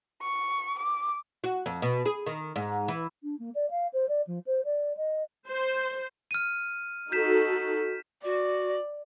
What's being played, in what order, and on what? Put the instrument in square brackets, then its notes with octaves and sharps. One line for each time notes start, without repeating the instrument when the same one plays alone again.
[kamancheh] C#6
D6
[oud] F#4
F2
B2
G#4
D#3
G#2
E3
[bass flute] D4
A#3
D5
F5
C5
D5
F3
C5
D5
D#5
[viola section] C5
[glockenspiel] F6 D#7
[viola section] D#4 F#4 A4 [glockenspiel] G6 B6 E7
[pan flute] F#4 [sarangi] D5